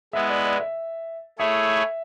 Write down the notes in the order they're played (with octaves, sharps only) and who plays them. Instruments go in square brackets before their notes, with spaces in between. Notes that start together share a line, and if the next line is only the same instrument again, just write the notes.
[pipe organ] G#3 B3 E4 [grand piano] E5
[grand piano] D5
D5
E5
[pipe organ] A3 E4 G#4 C#5 [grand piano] E5